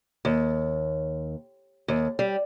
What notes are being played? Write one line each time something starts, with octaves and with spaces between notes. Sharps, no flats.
D#2
D#2
G3